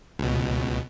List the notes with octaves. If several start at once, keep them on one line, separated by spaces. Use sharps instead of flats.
C#2 B2